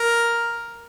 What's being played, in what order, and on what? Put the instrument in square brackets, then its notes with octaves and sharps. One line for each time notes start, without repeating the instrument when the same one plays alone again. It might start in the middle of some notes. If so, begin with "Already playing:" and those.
Already playing: [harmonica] A#4